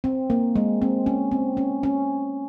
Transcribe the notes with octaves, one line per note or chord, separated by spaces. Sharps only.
C4
A#3
G#3
C4
C#4
C4
C#4
C#4